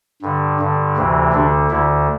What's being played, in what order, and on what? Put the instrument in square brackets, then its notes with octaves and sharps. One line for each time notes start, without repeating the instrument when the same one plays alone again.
[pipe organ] G2 D3
G2 D3
D2 C3 E3
D2 D3 D4
D2 D3 E4